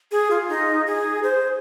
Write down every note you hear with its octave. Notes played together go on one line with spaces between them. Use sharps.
G#4
F4
D#4
G#4
C5